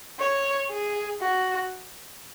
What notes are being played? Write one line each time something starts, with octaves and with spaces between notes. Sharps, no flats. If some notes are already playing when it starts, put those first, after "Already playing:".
C#5
G#4
F#4